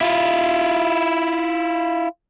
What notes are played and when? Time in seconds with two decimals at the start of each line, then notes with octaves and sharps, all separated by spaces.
0.01 E4 F4